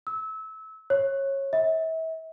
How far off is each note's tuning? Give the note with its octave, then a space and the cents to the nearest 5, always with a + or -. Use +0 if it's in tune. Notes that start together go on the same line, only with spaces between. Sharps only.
E6 -25
C#5 -20
E5 -35